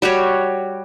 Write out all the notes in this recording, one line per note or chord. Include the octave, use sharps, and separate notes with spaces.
G3 F#4 G4 C#5